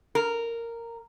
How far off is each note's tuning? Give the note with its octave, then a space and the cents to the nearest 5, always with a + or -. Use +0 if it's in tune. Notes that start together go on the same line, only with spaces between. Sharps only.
A#4 -10